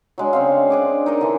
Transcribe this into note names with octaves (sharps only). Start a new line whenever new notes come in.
F#3 G#3 D4
C#3 C4 F5
D4 G#4 D5
D#4 A#4 D#5
D3 E3